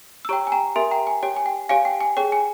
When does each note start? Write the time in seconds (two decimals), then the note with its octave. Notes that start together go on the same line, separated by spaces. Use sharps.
0.25 E6
0.29 G4 C#5 G5 A#5 C#6
0.47 G#5
0.52 G5 A#5
0.76 G4 A#4 E5 G#5 C6
0.91 G5 A#5
1.07 G#5
1.23 G4 C#5 G5
1.36 G#5
1.46 G5
1.69 G4 C#5 F5 G#5
1.85 G5
2.01 G#5
2.17 G#4 C#5 G5
2.32 G#5